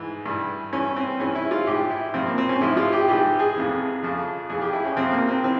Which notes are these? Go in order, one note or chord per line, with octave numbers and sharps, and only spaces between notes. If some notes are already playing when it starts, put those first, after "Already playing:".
Already playing: G#2 E3
G2 E3
G2 E3 C#4
C4
G2 E3 C#4
E4
F4
G#2 E3 G4
E4
G2 F3 C4
A#3
C4
C#4
G#2 F3 E4
F4
G4
G#2 E3 G4
G#4
F2 C3 E3
F2 C#3 F3
F2 E3 G#4
G4
E4
C#4
F2 C3 F3 C4
A#3
C4
E3 C4